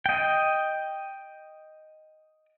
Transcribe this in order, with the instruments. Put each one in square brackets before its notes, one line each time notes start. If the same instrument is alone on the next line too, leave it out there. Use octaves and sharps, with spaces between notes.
[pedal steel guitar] D#5 G5